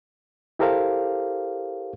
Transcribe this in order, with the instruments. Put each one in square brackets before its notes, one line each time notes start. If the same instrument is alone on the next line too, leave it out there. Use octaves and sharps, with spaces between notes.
[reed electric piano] E4 G4 A4 A#4 C5 F5